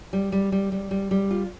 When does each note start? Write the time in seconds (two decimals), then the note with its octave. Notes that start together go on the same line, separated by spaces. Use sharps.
0.13 G3
0.32 G3
0.52 G3
0.72 G3
0.91 G3
1.11 G3
1.31 F4